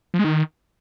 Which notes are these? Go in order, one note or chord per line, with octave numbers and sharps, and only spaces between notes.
F3
G#3
D#3